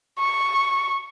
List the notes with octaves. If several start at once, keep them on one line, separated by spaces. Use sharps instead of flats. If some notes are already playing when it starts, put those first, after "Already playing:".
C#6